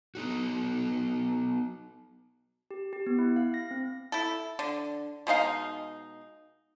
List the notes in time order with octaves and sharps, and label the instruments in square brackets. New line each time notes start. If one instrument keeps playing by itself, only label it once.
[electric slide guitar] B3 D#4 F#4
[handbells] G4
G4
B3
E4
F5
A#6
C4
[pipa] E4 A4
D3
B2 G#3 D#4 F5